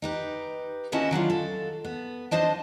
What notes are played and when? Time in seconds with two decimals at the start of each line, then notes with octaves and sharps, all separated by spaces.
0.02 D#4 G4 B4
0.92 D#2 C#4 E4 F#4 D#5 A5
1.11 D#3 F#3 D4 F4
1.30 A4
1.85 B3
2.31 F3 D4 C5 D#5 A5